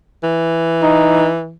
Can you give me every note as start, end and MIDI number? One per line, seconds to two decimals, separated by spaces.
0.23 1.55 52
0.83 1.30 63